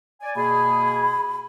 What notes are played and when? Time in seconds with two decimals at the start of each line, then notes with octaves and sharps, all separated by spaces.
0.22 D5 G#5
0.36 B2 A#3 G#4 B5